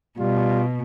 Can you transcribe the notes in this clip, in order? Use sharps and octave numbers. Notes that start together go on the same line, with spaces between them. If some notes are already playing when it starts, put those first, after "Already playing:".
B2 G3 F4